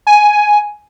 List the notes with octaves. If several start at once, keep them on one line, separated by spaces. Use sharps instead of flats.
G#5